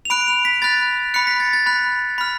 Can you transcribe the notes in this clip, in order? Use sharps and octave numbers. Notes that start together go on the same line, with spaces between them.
F7
B5 F#6 D7
F7
B6
B5 F#6 A6
B5 F#6 C#7
B6
A6
A6
B5 F#6
B5 F6